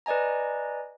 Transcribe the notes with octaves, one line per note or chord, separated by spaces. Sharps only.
B4 D5 D#5 G#5 A#5